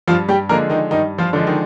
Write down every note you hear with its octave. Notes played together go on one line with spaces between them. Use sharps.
G2 F3 F4
G3 G4
D3 F3 G#3 A#3 A#4
D#3 D#4
G2 D#3 D#4
F3 F4
D3 F3 G#3
D#3 D#4